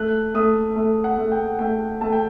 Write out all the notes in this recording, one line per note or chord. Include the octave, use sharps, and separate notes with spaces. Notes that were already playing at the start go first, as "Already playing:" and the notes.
Already playing: A3 F#6
A3 D#6
A3
F#5
A3
G5
A3 G5
A3 A5
G5